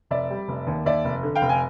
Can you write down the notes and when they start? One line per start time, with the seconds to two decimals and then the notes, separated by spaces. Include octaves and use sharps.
0.11 F1 D5 E5
0.30 G3
0.48 F1
0.67 D#2
0.86 D#2 D5 E5
1.05 F1
1.23 D3
1.35 F5 G5
1.42 F1
1.49 G#5